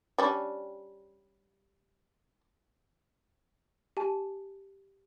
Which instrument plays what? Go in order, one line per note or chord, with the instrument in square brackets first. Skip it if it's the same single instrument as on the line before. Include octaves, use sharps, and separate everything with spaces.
[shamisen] G3 C#4 D4
[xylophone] G4 G#5 A5